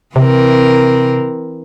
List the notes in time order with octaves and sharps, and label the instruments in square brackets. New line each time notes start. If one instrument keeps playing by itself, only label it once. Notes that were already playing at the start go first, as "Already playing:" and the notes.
[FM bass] C3 [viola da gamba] E3 C4 A#4